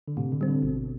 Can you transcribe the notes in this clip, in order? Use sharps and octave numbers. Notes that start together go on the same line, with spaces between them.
D3
A2 C3
D3
G3 C4
D3
G1 B2